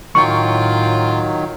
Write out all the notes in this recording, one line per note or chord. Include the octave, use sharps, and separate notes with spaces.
A2 D#3 F#3 F4 G5 C#6